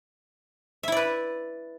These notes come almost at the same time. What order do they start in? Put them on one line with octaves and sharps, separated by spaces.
E5 E4 D5 B4